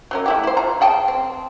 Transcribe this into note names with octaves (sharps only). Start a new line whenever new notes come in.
F#3 C#4 A#4
A3 E4 G4
E4 C5
F4 A#5
G#4 G5 A5
C4